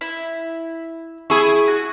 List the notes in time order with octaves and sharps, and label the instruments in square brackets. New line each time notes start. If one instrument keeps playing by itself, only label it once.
[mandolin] E4
[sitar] E4 G#4 [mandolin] C#6
[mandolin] F#4